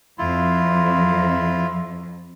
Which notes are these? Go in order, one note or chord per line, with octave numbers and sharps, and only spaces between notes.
F2 E4 F4